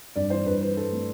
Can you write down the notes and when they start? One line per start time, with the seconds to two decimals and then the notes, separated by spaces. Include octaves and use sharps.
0.16 G2 D5
0.30 E3 C5
0.46 G2 B4
0.61 E3 B4
0.77 G2 A4
0.93 A3